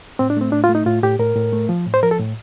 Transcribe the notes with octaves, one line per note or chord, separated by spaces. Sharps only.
A2 C4
D4
A3 C4
A2 D4
F4
A3
D#4
A2 F4
A2 G4
A2 A#4
A2
A3
F3
A2
C5
F3 A#4
A4
A2